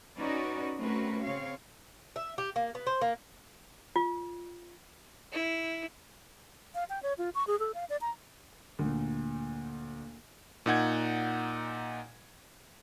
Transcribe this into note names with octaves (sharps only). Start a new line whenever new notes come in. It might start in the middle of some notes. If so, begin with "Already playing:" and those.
C#4 D#4 F#4 B4 D5
A3 C4 C#4 F#4 A#4 B4
C#3 C4 C#5 F5
E5
G4
A#3
B3
C5
A#3
F4
E4
F5
G5
C#5
F4
C#6
G#4
A4
F5
D5
A#5
D2 A#2
A#2 D#4 F#5 G#6